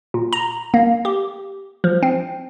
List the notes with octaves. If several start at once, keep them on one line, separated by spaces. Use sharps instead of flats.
A#2
A#5
A#3
G4
F3
C4